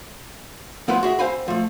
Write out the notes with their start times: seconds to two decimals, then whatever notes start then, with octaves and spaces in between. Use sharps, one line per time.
0.88 F3 B3 E4 F4 B4 C5
1.03 F#4 G#4 E5
1.19 C4 C5 F5 G#5 B5
1.48 F3 A3